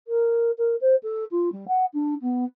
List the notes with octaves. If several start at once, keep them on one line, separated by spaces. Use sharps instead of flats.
A#4
A#4
C5
A4
F4
G3
F#5
D4
B3